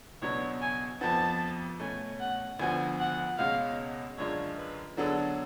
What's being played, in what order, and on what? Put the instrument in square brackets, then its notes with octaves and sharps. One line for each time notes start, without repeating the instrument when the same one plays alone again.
[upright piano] C#2 B2 F#3 B3 D4 [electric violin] C#5
[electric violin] G#5
[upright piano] F2 F3 B3 [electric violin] A5
[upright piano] B2 A3 C#4 [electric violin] G#5
[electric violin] F#5
[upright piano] D2 D3 F3 B3 F#4 [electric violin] G#5
[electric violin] F#5
[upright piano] C#2 B2 G#3 C#4 F#4 [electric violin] F5
[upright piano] F#2 D3 G#3 D4 F4 [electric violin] C#5
[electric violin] B4
[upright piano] D3 F#3 B3 D4 G#4 [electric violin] A4